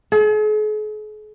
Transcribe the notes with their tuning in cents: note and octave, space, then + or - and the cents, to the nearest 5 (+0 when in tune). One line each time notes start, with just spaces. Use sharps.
G#4 +45